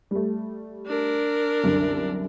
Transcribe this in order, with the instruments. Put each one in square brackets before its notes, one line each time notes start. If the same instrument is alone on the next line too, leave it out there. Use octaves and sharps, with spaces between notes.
[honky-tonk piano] G3 A3
[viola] D4 A#4
[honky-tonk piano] C2 F#2 D3